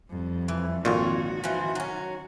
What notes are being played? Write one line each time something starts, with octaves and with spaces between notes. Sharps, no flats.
F2 G3
E3
G#1 F2 A#2 D#3 F4 F#4 C#5
E3 F3
F#3 C#4